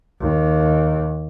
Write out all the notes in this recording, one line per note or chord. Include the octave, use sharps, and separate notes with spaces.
D#2